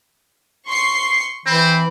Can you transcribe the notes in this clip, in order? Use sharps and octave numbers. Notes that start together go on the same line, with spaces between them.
C6 C#6 C7
E3 C4 B5